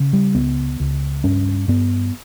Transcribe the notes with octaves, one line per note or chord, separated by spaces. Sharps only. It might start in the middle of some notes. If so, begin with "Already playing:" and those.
Already playing: C#3
G3
C#2 B3
C#2
G2 C#4
G2 B3